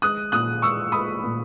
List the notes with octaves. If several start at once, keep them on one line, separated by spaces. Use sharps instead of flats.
G#3 D#6 F#6
A#2 D#6 F#6
G#3 C#6 E6
G#3 B5 D#6
A#2